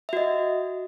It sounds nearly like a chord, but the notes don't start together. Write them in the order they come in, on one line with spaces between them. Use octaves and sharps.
E5 F#4 D#5